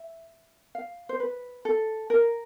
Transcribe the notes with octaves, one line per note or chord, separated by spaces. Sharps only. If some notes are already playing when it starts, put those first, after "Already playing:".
Already playing: E5
F5
C5
B4
A4
A#4